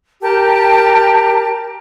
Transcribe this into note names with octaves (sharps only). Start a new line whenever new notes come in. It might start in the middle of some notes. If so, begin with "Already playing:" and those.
G4 A#4 G5 A5